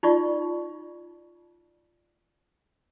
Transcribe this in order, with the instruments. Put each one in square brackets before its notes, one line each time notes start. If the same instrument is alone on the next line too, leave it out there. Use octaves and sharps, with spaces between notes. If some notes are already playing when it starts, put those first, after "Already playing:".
[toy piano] D#4 F4 F#4 D5 C#6